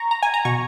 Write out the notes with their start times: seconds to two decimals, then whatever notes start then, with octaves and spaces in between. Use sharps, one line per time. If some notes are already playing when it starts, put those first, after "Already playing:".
Already playing: A#5 C#6
0.11 A#5
0.23 G#5
0.34 A#5
0.45 B2 C#6